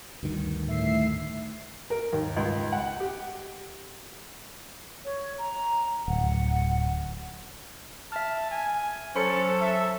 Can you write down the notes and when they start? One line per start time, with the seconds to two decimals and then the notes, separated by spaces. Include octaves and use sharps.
0.23 D2 G2 D#3
0.67 A2 E5 C7
1.90 A#4
2.13 D#2
2.36 C#2
2.73 F#5
3.00 G4
5.05 C#5
5.38 A#5
6.08 D1 F#5
8.12 E5 A5 F6
8.51 G#5
9.16 F#3 C#4 A4 C5 B5 C#7
9.61 E5